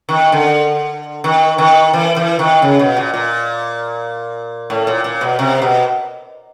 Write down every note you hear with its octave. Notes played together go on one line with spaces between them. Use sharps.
D#3
D3
D#3
D#3
E3
E3
D#3
C#3
B2
A#2
A#2
A2
A#2
A#2
B2
C3
B2